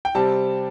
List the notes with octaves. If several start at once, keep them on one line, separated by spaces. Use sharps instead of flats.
G5
C3 G3 C4 A5